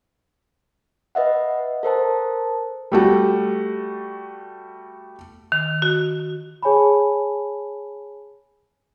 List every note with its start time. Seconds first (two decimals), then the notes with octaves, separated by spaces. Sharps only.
1.15 B4 D#5 E5 F#5
1.83 A4 A#4 C5 A5
2.92 G3 A3 F#4
5.52 D#3
5.82 F#4
6.63 G#4 C#5 G#5 A5 B5